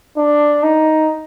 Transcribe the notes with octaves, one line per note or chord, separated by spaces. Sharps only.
D4
D#4